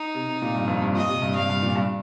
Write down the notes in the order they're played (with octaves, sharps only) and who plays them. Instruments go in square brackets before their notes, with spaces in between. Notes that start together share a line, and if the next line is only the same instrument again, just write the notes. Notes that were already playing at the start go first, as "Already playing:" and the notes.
Already playing: [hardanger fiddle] D#4
[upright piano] C3
C3
A#2
G2
F2
G2
[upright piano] A#2 [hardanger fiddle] D#5
[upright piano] C3
G2
[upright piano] G2 [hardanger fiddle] F5
[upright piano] G2
A#2
G2